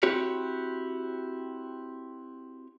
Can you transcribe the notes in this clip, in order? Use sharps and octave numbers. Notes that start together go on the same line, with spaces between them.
C4 E4 F#4 G4 C#5